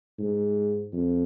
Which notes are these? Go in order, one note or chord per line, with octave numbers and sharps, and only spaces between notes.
G#2
F2